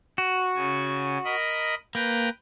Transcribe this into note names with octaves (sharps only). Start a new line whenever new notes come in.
F#4
C#3 G#5
A#4 D#5 B5
A#3 B4 G5 A#5